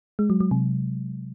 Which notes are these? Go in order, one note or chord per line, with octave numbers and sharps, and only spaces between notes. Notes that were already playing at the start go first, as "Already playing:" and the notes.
G#3
F#3
F#3
C3